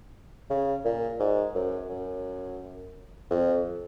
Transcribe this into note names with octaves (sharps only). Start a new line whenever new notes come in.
C#3
A#2
G#2
F#2
F#2
F2